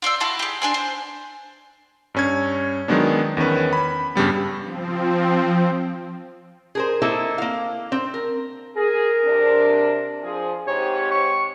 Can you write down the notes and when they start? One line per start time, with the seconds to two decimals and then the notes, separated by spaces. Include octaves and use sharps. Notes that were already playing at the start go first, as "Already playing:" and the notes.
0.02 F4 C5 D5 E6
0.20 E4 F#4 A5 C6
0.39 G4 G#4
0.62 D4 G#5 C6
0.74 C5
2.14 G2 C#4 G#6
2.88 D#3 F#3 G#3 B3 D4
3.37 E2 D#3 C#4 B4
3.73 B5
4.15 G2 C#3 G3 B3
4.63 F3 C4
6.75 G#4 A#4 C5
7.02 A#3 C4 D#4 E4 A4
7.38 A#3 F5
7.92 C4
8.14 A#4
8.76 G#4 A#4
9.25 C3 D4
10.23 F3 G#4
10.67 G#2 C4 G4 C#5
11.11 C#6